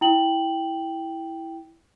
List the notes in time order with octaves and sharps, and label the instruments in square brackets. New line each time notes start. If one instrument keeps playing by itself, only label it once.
[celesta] E4 G5 F#7